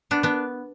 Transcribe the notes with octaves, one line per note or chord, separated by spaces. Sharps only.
B3 D4
B3 D4